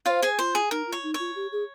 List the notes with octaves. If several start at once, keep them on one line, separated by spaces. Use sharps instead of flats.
F4 C5 C#5 F5
G#4 G#5
F4 C5
G#4
D#4 A#4
F4
C#5
D#4
C#5
F4
G4
G#4